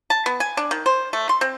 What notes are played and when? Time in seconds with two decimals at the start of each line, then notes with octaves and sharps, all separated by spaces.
0.10 A5
0.26 B3
0.40 G#5
0.57 D4
0.71 D#3
0.86 C5
1.13 A3
1.29 C6
1.41 C4